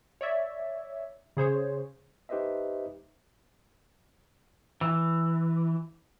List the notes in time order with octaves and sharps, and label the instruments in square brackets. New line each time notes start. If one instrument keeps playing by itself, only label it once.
[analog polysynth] C#5 D5 E5
C#3 G#4 C5 C#5
[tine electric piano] D#4 G4 B4 C5 D#5 E5
[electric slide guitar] E3